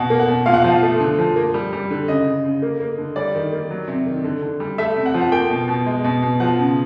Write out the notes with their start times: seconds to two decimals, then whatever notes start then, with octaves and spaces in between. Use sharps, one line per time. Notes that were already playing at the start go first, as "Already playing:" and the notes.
Already playing: B2 F#5
0.10 A#3
0.20 F#5
0.28 B2
0.46 A#2 F5
0.53 F#5
0.62 F3 F5
0.83 A3
1.00 D3
1.19 F3
1.36 A#3
1.54 G3
1.73 G3
1.90 D3
2.08 C#3 D#5
2.26 C#3
2.44 C#3
2.62 A#3
2.80 A#3
2.98 D3
3.16 G3 D5
3.35 D#3
3.53 A#3
3.71 F#3
3.88 C3
4.06 D#3
4.24 D3
4.42 D3
4.60 G3
4.78 A3 E5
4.96 C3
5.06 F#5
5.14 F3
5.21 F#5
5.32 A#3 G5
5.50 B2
5.68 B2
5.86 G#3
6.04 B2
6.22 B2
6.40 F3 F#5
6.58 C#3